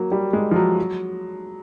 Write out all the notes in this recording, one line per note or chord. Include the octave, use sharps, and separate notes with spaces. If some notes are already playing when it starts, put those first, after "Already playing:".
Already playing: F#3 A#3
G3
G#3
F3
F#3
F#3